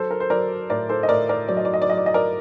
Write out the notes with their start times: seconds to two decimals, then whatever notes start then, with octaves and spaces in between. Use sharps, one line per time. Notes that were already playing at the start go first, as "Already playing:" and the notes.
Already playing: F#3 A4 C5
0.11 A#4
0.20 C5
0.30 F#3 A#4 D5
0.69 A2 A#4 D5
0.89 A4 C5
1.03 D#5
1.09 A2 A#4 D5
1.29 A#4 D5
1.48 F#3 D5
1.57 D#5
1.65 D5
1.74 D#5
1.82 D5
1.88 F#3 D#5
1.98 D5
2.06 D#5
2.14 A#4 D5